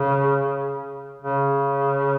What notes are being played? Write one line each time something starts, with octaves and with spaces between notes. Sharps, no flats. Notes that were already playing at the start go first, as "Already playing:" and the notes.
Already playing: C#3
C#3